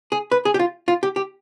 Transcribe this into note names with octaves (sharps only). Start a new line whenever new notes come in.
G#4
B4
G#4
G4
F4
F4
G4
G4